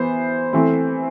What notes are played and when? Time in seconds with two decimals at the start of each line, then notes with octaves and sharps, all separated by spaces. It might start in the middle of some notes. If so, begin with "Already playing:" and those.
Already playing: E3 B3 C5
0.53 E3 A3 C4